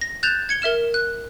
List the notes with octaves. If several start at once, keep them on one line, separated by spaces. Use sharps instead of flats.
A#6
F#6 G6 A6 E7 F7
G#6 C#7 G7
A#4 E5 F6 E7
F#6